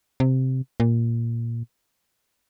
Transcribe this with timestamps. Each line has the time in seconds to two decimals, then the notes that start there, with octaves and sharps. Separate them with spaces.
0.20 C3
0.80 A#2